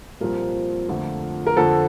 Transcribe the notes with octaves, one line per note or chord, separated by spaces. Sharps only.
C2 A#2 F3 C4 A#4
F2 D3 F3 A3
A#4
F2 D3 F3 A4